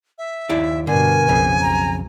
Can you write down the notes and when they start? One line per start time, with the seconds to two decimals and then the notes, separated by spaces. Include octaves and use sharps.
0.18 E5
0.49 D#2 E4 D5
0.87 G2 B2 D3 A#4 G#5
1.29 A#1 F2 C#3
1.61 B1 A#5